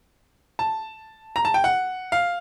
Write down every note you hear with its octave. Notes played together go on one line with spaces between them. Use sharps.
A5
A#5
A5
G5
F#5
F5